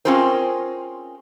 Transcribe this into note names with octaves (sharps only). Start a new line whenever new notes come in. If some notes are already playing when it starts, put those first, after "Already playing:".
C4 C#4 F4 G#4 A#4 C5